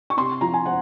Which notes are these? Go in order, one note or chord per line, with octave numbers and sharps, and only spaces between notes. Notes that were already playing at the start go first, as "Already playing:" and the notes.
C#6
C3 C6
F3 A#5
G#5
C4 F#5